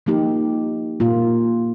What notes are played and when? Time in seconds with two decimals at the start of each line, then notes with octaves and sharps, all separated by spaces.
0.06 F3 A#3 D#4 G4
1.00 A#2 A#3 F4